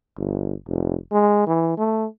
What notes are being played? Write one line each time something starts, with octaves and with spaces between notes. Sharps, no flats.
G1
F1
G#3
E3
A3